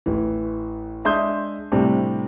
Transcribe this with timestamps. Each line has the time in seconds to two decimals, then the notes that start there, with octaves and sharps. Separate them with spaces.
0.06 A1 E3
1.05 G#3 D4 E5 C6 D#6 G6
1.72 A2 C3 G3 C4 D4